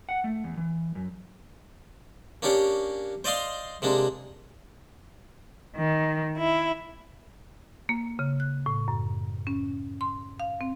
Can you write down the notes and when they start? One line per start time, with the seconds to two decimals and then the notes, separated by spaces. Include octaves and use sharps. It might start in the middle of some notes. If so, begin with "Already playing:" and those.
0.09 F#5
0.24 A3
0.44 E2
0.57 E3
0.95 F#2
2.42 A#3 C#4 D4 G4 C#5
3.24 C5 D5 D#5 F5 C6
3.82 C3 G#3 A#3 D4
5.77 D#3
6.37 E4
7.89 A#3
8.19 C#3
8.40 F#6
8.66 A2
8.88 F#2
9.47 C#4
10.01 C6
10.40 F5
10.61 C4